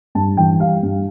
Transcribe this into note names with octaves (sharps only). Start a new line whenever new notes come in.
G2 A5
E3 G5
G3 F5
G2